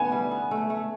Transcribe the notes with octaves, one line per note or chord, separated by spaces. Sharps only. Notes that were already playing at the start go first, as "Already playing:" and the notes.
Already playing: D3 A3 B3 G#5
G3
B3
A3
A3